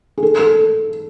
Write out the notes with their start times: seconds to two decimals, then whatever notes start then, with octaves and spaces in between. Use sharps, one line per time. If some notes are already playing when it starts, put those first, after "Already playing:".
0.18 G#4
0.23 A4
0.39 A4